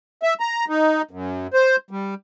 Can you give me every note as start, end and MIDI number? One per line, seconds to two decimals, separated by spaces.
0.23 0.34 76
0.40 0.65 82
0.69 1.02 63
1.11 1.47 42
1.54 1.76 72
1.91 2.14 55